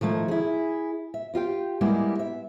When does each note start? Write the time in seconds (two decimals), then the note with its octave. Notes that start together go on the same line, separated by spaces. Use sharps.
0.01 D#3 F3 A3 E4
0.28 E4 G#4
1.14 E5
1.34 E4 F4 G4 G5
1.81 G3 G#3 A#3 B3 E4
2.19 E5